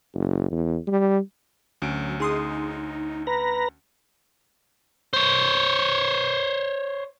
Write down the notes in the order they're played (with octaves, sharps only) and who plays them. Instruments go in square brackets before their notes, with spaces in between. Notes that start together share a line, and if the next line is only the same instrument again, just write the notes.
[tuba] F#1
E2
G3
[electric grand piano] D2 C#4 D7 [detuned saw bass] F#3
[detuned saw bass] D#4 [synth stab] G#4 C6 D#6
[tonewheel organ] B4 A#5
[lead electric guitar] C5 C#5